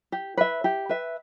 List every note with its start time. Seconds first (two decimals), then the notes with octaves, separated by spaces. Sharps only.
0.12 G4
0.37 B4 E5
0.64 G4
0.89 B4 E5